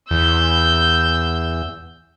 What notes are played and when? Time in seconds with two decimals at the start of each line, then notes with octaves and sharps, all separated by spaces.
0.11 E2 E6 G6